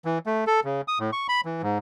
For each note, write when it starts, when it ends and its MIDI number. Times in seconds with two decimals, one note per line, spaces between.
0.05 0.18 52
0.26 0.44 57
0.47 0.60 69
0.64 0.81 49
0.88 0.98 87
0.99 1.11 45
1.13 1.27 85
1.29 1.41 83
1.45 1.62 52
1.62 1.78 44